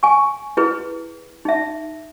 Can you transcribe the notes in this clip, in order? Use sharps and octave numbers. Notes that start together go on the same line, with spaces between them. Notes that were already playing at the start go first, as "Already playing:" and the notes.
G#5 C#6
E4 G#4 B4
D#4 E5